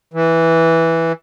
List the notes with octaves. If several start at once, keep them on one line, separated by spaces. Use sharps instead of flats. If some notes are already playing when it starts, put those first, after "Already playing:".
E3